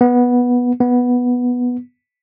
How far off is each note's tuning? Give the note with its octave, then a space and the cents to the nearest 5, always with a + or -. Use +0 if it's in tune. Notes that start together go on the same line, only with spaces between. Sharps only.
B3 -10
B3 -5